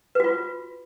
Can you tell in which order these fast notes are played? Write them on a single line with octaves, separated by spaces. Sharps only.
B4 F#4 F4